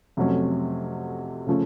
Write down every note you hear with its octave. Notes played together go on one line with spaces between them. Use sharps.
F2 C3 F#3 A3 C#4
C#3 F3 A3 C#4